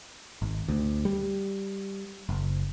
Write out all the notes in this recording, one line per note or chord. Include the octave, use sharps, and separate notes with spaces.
G#1
D2
G3
F#1